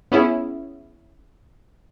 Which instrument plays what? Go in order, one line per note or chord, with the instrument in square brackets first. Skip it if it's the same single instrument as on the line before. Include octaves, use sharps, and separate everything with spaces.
[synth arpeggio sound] B3 C#4 E4 G#4